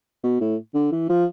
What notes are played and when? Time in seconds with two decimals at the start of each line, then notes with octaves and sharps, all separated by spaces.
0.23 B2
0.41 A2
0.74 D3
0.92 E3
1.09 F3